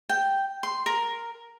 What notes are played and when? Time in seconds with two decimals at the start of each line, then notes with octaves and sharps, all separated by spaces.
0.09 G5
0.63 C6
0.86 A#4